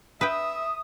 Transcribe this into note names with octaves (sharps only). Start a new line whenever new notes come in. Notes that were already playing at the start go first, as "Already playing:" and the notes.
B4 E5 G5 D#6